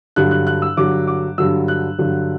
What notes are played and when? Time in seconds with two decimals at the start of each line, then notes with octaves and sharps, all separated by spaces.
0.16 G2 D3 F#3 F#6
0.31 F#6
0.47 F#6
0.62 E6
0.77 G2 D3 F#3 D6
1.07 D6
1.38 G2 D3 F#3 E6
1.68 F#6
1.98 G2 D3 F#3